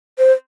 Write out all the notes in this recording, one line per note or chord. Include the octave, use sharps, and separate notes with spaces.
C5